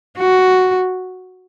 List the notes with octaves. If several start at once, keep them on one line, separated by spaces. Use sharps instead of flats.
F#4